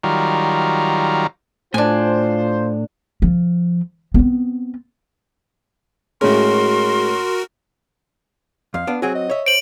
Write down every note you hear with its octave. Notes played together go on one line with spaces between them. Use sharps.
D#3 F#3 G3 F4 A#4
A2 D4 F4 C5 G#5
F3
B3 C4
A2 G#3 C#4 F#4 A#4 C6
F2 F5
B3 D4
F#3 C4 F#4 G#4
D#5
C#5 E5
C5 D7 F#7